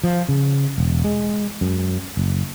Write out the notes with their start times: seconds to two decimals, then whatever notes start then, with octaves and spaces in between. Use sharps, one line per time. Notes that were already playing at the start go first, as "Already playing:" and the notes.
0.04 F3
0.29 C#3
0.78 E1
1.04 G#3
1.61 F#2
2.17 F#1